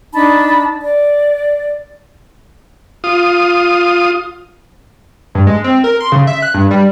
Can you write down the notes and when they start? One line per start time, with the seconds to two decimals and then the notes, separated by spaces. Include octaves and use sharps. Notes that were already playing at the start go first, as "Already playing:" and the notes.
0.14 D4 D#4 A5 B5
0.82 D5
3.04 F4 D#6
5.35 G2
5.47 G#3
5.64 C4
5.84 A#4
6.00 C6
6.12 C#3
6.27 E5
6.42 F#6
6.54 G2
6.71 G3